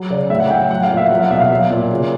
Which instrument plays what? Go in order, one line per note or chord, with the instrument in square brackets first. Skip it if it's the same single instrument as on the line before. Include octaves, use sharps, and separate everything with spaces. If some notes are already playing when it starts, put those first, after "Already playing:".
Already playing: [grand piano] F#3
C#3 D5
A2 E5
F#5
A2 G5
G5
F#3 F#5
F5
A#2
E5
F#3 F#5
F5
B2 E5
F5
F#3
A#2
C#3